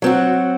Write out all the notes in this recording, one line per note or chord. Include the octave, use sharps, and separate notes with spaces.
F#3 C4 F#4